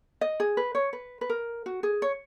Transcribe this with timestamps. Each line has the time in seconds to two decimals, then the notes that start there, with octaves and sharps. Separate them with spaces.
0.21 D#5
0.40 G#4
0.57 B4
0.75 C#5
0.93 B4
1.21 B4
1.30 A#4
1.66 F#4
1.83 G#4
2.02 C#5